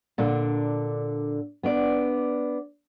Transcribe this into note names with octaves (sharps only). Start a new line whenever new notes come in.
A#2 D3 D4
B3 D4 D5